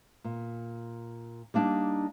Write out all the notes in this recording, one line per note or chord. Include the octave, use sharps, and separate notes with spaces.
A#2
G3 A#3 D4 D#4